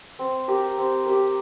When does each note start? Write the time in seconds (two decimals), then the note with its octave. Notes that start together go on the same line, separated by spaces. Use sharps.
0.19 C4
0.48 G4 A#4
0.78 C4
1.06 G4 A#4